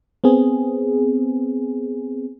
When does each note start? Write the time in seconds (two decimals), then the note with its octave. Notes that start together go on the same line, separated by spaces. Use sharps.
0.24 B3 C4 G#4